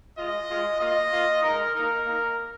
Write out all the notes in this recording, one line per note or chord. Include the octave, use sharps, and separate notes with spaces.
G#3 F4 D#5
G#3 F4
A#3 F4 D#5
A#3 F4
G#3 D#4 A#4
A#3 D#4 A#4
A#3 D#4